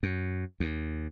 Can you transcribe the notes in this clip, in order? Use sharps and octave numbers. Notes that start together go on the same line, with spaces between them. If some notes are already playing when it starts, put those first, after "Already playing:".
F#2
D#2